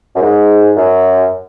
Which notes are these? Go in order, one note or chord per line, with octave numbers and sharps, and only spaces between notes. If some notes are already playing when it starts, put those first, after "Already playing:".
F#2
G#2
F#2